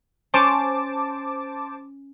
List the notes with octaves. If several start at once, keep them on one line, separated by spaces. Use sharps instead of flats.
C#4 C5 A5 D6